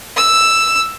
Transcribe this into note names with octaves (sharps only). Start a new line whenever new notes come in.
E6